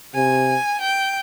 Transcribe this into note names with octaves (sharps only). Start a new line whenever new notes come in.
C3 G#5
G5